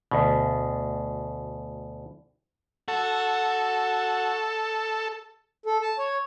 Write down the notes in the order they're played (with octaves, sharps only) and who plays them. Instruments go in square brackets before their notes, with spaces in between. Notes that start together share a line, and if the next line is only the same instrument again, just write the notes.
[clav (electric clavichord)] D2 B2
[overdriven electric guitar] F#4 [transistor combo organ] A4
[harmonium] A4
A5
C#5